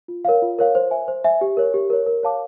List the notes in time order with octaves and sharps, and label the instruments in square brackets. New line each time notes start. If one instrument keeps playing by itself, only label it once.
[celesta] F4
A#4 C#5 F5
F4
A#4 C#5 F5
C5
E5 G#5
C5
E5 G#5
G4
A#4 C#5
G4
A#4 C#5
A#4
C#5 F5 A5 D6